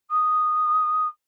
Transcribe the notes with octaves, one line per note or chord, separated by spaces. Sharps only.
D#6